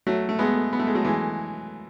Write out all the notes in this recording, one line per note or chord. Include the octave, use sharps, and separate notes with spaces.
F#3 A3
A3
G#3 B3
B3
A3
G#3
F#3 A3
E3 G#3